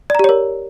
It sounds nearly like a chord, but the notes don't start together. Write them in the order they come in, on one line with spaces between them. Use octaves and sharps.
D5 A#5 G4 C#5 A#4